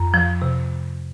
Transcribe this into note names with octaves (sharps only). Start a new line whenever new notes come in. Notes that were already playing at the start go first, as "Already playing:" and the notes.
Already playing: F2 A#5
F3
C3